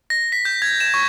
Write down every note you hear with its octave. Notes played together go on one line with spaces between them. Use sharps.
A#6
B6
G6
G#6
E7
C#6